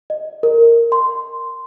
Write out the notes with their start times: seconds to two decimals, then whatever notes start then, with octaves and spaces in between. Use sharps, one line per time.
0.10 D#5
0.43 A#4
0.92 C6